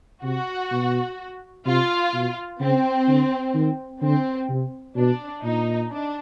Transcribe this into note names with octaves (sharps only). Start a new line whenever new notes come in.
C3 F#4
B2
C3 F4
B2
C#3 C4
D3
D#3
D3 C4
C3
B2 D4
A#2 D#4
D4